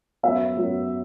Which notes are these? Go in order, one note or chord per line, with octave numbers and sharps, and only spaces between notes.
F#2 F#3 B3 E5
F#2 F#3 B3